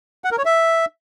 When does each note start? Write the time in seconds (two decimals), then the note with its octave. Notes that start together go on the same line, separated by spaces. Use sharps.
0.24 F#5
0.31 A#4
0.38 C#5
0.45 E5